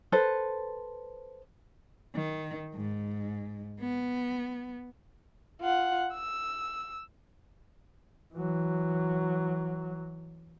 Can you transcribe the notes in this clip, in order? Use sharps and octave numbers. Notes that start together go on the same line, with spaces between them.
A4 B4 C5
D#3
G#2
B3
F4 F#5
E6
E3 F#3